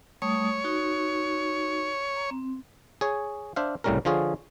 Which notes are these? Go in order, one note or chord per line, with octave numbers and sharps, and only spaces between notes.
G3 A3 C#5 D#6
D#4 F#4
A#5
C4
G#4 C#5
D4 C5 E5 F5
C2 A2 C#3 G3 C#4 A#4
D3 F3 F4 G#4 C#5